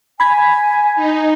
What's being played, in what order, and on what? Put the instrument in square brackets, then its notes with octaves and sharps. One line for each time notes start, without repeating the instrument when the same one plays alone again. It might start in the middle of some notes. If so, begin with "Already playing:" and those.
[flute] G#5 [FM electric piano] B5 G#6 B6
[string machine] D#4